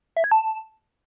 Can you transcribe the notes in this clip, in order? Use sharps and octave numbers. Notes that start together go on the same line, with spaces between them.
E5
G#6
A5